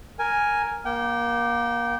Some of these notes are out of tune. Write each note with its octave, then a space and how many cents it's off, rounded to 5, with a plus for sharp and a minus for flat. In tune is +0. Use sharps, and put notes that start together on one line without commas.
A#4 +0 G#5 +0
A#3 +25 G5 -25